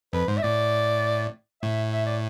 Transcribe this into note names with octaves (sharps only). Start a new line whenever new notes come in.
F2 B4
G#2 C5
E5
A2 D5
A2 E5
E5
D5